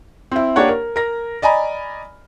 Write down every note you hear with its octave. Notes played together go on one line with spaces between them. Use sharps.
C4 E4
A#3 D4 G4 C#5 F#5
A#4
A#4 A#6
D5 D#5 G#5 A#5 B5